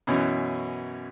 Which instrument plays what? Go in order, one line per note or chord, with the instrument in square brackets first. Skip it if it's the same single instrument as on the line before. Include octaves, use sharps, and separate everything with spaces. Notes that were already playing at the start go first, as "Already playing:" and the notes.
[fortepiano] F#2 B2 E3 C#4